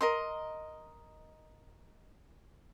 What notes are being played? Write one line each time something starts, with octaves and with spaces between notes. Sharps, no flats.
A#4 D#5 C6